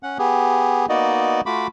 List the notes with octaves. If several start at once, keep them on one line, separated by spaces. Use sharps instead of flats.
C#4 F#5
B3 G4 G#4
A#3 B3 D#4 F#4 D5 D#5
A3 F4 F#4 B5 D6